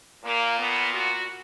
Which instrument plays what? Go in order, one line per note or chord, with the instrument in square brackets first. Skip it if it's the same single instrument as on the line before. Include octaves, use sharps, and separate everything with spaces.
[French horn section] A#2 A#3
B3
F#4